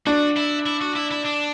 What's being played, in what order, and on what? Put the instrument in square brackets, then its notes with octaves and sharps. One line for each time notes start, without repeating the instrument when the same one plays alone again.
[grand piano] D4 [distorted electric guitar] F#4
[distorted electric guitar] E4
E4
F#4
E4
E4
D4